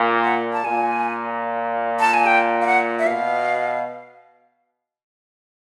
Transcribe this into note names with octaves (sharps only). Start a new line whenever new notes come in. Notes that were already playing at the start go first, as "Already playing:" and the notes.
Already playing: A#2
F#5
A5
A#2 G#5
A5
G#5
G5
F5
F#5
E5
B2 F5